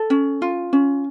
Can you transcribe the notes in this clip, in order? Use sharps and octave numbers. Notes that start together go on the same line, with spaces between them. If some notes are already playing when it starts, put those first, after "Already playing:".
Already playing: A4
C#4
F4
C#4